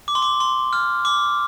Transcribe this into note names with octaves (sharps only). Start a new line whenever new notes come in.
D6
C6
D6
C6
F6
D6